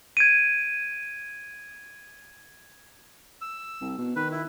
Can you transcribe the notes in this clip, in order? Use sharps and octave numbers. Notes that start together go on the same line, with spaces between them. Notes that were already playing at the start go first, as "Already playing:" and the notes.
G#6 D7 D#7
E6
C2
B2
D#3 B4
E4